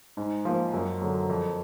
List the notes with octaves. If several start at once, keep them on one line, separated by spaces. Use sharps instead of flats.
G#2
F3 A#3
F#2
D3 F#3
F2